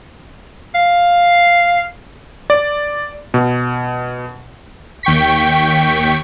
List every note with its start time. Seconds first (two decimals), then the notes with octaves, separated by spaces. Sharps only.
0.75 F5
2.50 D5
3.34 B2
5.03 D#2 G5 C#6 B6